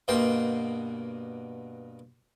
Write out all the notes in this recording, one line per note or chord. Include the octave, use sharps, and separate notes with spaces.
G2 B2 A#3 G5 C6